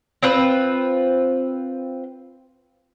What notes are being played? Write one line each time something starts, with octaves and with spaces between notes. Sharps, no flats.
C4 F4 B4